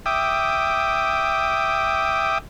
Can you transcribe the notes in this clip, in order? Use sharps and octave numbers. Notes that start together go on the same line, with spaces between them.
E5 G5 D6 D#6